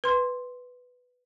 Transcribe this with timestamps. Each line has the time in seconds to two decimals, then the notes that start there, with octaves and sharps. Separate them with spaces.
0.04 B4 C6